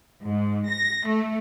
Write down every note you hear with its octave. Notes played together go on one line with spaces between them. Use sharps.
G#2
A#6
A3